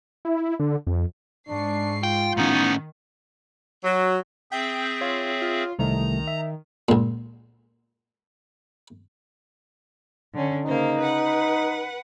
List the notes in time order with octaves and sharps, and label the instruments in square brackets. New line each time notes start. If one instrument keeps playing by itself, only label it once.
[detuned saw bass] E4
D3
F2
[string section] G#2 C#6 C7 [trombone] D4
[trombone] F4 [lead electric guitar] G5
[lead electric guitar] A2 C#4 [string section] D#3 [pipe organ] B3 D#4
[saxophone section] F#3
[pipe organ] C4 G#4 E5 [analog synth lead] G5
[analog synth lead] F4 [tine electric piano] C#5
[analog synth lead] F4
[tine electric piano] C2 A3 [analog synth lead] D#3 [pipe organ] A#5
[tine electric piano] E5
[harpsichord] C#2 A#2
[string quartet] D3 C#4
[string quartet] C#3 A#3 C5 [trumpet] D#4
[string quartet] B4 F#5